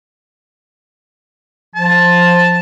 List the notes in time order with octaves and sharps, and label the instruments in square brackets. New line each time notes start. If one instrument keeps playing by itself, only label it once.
[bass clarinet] F3 [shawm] A5